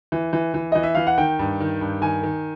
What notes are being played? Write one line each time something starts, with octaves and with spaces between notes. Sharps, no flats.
E3
E3
E3
E3 D#5
E5
E3 F5
F#5
D#3 G5
G2
D#3
G2
D#3 G#5
D#3